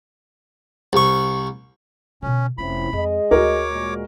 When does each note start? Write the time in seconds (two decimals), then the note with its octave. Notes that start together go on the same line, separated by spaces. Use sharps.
0.93 C2 C#6
2.22 B2 D3 C#4
2.58 F1 C4 C#4 E4 F4 B5
2.93 F2 G#3 G#4 D#5
3.31 D2 F#4 A#4 C#5 D6
3.71 A#2 G#3